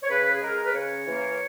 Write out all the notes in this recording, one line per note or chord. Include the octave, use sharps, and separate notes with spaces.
C#5
C#3 B4
G#4
G#3 A#4
B4
C#3 C#5
E3 A#3